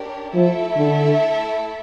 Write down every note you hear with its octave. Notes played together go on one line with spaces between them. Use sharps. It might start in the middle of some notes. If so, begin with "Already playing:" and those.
Already playing: D4 G4 A#4 C#5
F3 A3 E4 A4 E5
D3